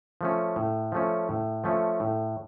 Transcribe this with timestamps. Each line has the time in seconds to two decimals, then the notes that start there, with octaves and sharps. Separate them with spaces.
0.21 F3 A3 C#4
0.56 A2
0.92 F3 A3 C#4
1.29 A2
1.64 F3 A3 C#4
2.00 A2